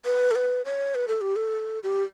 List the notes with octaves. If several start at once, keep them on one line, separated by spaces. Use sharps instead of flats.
B4
A4
B4
C#5
B4
A4
G4
A4
G4